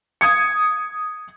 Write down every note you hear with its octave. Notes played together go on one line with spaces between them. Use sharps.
D#6 G#6 C#7